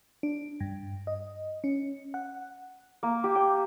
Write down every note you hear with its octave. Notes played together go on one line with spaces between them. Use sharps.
D4
G2
D#5
C#4
F#5
A#3
G4
G5